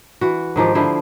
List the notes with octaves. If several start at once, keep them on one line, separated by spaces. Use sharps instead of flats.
E3 F#4
G#2 D#3 F3 G4
D3 F3 E4 C5